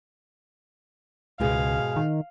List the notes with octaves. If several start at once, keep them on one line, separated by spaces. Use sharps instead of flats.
C#2 G#2 B2 G#4 F5
D#3